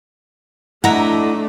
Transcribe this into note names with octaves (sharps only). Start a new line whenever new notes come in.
A3 D4 E4 D#5 F#5 A#5